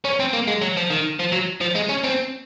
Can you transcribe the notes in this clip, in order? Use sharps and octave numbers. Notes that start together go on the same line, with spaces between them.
C#4
C4
A#3
G#3
F#3
F3
D#3
F3
F#3
F3
G#3
C#4
C4